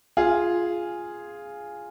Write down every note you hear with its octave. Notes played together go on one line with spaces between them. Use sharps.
F4 G#4